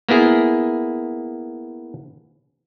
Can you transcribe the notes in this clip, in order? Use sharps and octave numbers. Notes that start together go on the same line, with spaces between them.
A#3 B3 E4 G#4